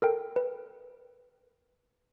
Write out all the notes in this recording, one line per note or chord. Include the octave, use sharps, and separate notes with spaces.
A4 A#4 G5
B4